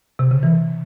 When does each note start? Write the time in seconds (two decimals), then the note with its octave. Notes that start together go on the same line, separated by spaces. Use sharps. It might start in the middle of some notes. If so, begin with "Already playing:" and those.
0.19 C3
0.31 C#3
0.43 E3